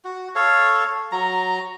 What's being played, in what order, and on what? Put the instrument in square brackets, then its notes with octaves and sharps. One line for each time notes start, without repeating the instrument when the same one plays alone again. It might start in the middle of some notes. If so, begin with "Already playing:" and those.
[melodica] F#4
A4 C#5 F5
F#3 A#5